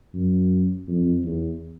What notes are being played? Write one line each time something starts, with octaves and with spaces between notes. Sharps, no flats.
F#2
F2
E2